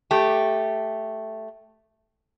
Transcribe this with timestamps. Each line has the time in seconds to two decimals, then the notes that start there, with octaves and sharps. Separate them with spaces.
0.11 A3 G4